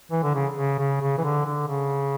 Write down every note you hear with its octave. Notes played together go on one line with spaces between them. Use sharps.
E3
D3
C#3
C#3
C#3
C#3
E3
D3
D3
C#3